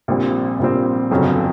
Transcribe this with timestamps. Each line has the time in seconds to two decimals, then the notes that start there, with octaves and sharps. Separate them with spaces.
0.08 A#1 A#2 G3 C4
0.60 A#1 A#2 G3 C4
1.11 G1 F2 C#3 F#3